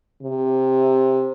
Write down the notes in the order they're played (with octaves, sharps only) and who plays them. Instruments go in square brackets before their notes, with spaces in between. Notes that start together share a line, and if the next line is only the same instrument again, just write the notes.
[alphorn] C3